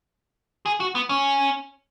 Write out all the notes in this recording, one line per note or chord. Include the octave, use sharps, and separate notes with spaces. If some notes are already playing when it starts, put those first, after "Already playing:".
G#4
F#4
B3
C#4